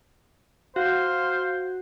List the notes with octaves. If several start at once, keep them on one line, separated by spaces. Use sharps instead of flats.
F#4 C5 F5